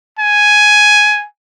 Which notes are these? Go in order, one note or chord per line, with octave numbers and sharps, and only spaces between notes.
G#5